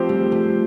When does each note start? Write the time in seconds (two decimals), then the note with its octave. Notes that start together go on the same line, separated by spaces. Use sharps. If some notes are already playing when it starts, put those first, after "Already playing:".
Already playing: F3 A3 C4 G4 C5
0.09 G3
0.32 A3